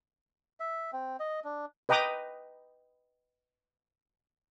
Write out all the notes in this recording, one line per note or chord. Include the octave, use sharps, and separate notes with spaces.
E5
C4
D#5
D4
B4 D#5 G5 A#5 D6 D#6